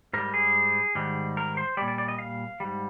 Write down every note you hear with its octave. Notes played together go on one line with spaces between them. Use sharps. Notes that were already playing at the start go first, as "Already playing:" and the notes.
G#2 G3 A#4
G#4
G#2 D#3 G3
A#4
C5
A#2 G3 D5
D5
D5
D#5
F5
G#2 G3